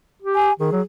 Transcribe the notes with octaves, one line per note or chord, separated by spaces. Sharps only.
G4
G#5
D#3 G#4
F#3